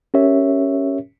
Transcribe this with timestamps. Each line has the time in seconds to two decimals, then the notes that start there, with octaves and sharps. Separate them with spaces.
0.14 C#4 G4 A#4 C#5 E5